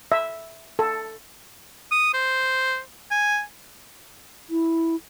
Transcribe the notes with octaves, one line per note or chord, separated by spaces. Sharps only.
E5
A4
D#6
C5
G#5
E4